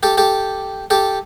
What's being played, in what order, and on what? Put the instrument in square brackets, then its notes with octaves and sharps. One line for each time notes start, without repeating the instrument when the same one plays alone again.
[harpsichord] G4 A4
G4 A4
G4 A4